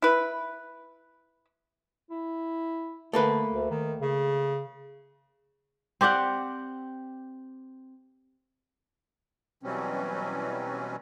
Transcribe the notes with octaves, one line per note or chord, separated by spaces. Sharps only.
E4 B4
E4
D3 A3 A#3 B4
D2
D#3
C#3
C4 G4 D5 F#5
B2 E3 F#3 G3 C4 C#4